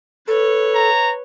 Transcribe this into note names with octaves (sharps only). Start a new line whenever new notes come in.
A4 B4 C#5
A#5